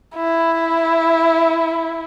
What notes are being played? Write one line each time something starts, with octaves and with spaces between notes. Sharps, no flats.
E4